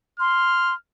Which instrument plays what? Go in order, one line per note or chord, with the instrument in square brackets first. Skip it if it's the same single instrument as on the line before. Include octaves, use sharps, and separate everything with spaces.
[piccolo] C6 [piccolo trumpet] F6